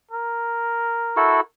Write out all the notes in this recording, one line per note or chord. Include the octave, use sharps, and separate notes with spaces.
A#4
E4 F#4 A4